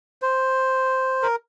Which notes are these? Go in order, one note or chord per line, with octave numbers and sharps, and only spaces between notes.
C5
A#4